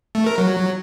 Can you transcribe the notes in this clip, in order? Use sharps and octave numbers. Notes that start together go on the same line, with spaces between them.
A3
A#4
F#3